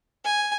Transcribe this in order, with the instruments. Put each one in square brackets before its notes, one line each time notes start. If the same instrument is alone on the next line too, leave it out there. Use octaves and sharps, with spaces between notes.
[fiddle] G#5